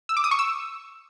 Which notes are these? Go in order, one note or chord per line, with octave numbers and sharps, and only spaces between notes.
E6
D6
D#6
C#6
E6